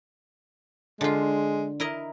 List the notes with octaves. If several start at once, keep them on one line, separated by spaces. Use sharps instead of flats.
D3 G#3 F4
E4 A#4 D#5